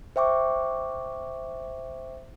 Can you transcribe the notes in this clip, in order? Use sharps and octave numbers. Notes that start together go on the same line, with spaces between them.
C5 E5 G5 C#6 D6